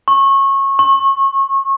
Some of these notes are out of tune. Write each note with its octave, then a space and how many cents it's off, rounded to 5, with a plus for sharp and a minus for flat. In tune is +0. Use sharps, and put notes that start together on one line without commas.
C#6 -25
C#6 -35